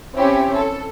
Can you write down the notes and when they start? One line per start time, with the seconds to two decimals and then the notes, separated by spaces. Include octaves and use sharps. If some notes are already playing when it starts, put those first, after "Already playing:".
0.15 C4 C#4 E4 G4 C#5
0.56 A4